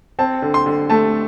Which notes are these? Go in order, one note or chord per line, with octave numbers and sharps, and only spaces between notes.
C4 A5
D3
C6
D3
A3 A5